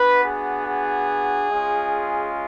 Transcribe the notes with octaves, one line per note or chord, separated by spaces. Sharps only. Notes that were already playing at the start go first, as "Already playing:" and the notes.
Already playing: B3 D4 F#4 B4
G#4
G#4
G#3 C#4 F4